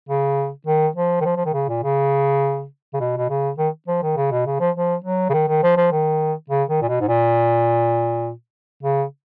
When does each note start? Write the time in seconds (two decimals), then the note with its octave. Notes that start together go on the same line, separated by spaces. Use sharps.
0.09 C#3
0.67 D#3
0.96 F3
1.21 D#3
1.25 F3
1.37 F3
1.46 D#3
1.54 C#3
1.69 A#2
1.84 C#3
2.93 C#3
3.00 B2
3.18 B2
3.30 C#3
3.58 D#3
3.88 F3
4.03 D#3
4.17 C#3
4.31 B2
4.46 C#3
4.60 F3
4.75 F3
5.04 F#3
5.30 C#3
5.33 D#3
5.48 D#3
5.63 F3
5.77 F3
5.92 D#3
6.50 C#3
6.69 D#3
6.82 A#2
6.89 B2
7.01 G#2
7.08 A#2
8.83 C#3